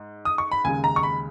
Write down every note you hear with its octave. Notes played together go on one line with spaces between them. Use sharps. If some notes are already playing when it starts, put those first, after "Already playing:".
Already playing: G#2
D#6
C#6
B5
D#2 C#3 G#3 G#5
A#5
C#6
B5